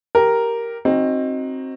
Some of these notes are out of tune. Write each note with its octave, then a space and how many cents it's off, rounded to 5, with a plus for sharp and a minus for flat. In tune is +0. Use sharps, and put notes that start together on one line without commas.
G4 +0 A#4 +0
C4 +20 D#4 +0 F#4 +0